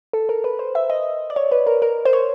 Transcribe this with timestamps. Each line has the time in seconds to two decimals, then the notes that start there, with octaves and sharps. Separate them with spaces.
0.13 A4
0.29 A#4
0.44 B4
0.59 C5
0.75 E5
0.90 D#5
1.30 D5
1.36 C#5
1.52 B4
1.67 A#4
1.82 A#4
2.05 C5
2.13 C#5